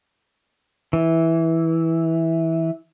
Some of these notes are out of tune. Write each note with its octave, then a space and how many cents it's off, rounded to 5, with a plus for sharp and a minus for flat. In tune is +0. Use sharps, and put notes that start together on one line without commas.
E3 -10